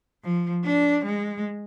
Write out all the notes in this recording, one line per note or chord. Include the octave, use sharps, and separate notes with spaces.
F3
D4
G#3